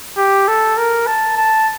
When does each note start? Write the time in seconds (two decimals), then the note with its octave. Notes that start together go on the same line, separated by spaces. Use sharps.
0.17 G4
0.48 A4
0.77 A#4
1.07 A5
1.37 A5